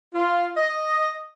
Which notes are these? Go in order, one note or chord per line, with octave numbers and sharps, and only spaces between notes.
F4
D#5